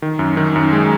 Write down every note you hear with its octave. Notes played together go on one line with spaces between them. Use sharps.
D#3
F#2
D#3
F#2
G#3